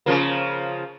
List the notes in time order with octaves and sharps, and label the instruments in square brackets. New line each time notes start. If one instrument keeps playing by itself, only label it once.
[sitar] C#3 F3 A#3